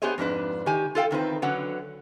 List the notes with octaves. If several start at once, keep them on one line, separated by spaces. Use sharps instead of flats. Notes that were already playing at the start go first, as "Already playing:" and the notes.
B3 G4 G#4 C5 C#5 D#5
F2 G#2 D4 B4
D#3 G4 G#5
F4 A4 F5 G5
E2 D#3 C4 B4
D3 F#3 C#4 B4 F#5